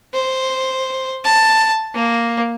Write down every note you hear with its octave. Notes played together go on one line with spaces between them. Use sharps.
C5
A5
A#3